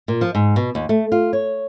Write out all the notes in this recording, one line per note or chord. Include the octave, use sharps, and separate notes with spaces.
A#2
F3
G#2
B2
D#2
A3
F4
C#5